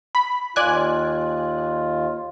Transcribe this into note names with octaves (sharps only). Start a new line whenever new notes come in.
B5
D#2 F4 D5 G#5 F#6